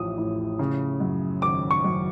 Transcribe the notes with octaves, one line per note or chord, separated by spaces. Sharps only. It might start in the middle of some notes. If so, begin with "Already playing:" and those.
Already playing: A1 A2 F3 D#6
A2
C#3
F#2
G#1 D6
C#6
F#2